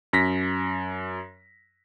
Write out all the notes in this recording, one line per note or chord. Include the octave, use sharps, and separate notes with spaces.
F#2 A#6 B6